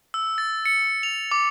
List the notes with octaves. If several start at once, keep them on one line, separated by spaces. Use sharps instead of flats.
E6
A6
C#7
F7
D6